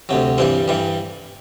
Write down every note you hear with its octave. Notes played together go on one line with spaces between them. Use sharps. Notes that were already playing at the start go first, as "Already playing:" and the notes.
D2 C3 F#3
G2 E3 G3 C4
G2 E3 G3